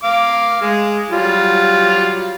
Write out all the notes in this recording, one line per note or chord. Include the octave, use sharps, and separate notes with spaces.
F5 D6
G#3
F#3 G3 F4